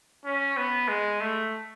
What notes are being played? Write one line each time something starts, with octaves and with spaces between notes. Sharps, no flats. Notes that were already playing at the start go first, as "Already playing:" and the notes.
C#4
B3
G#3
A3